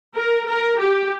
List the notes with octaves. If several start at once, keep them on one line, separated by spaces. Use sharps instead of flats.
A#4
A#4
G4